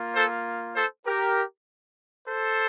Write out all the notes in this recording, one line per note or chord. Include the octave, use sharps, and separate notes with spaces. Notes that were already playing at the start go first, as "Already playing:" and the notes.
Already playing: A#3 F4
A4 C5
A4 C5
G4 A#4
A4 C5